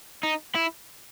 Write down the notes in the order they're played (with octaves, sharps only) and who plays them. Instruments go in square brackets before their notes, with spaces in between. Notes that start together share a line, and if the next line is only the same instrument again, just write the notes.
[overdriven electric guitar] D#4
E4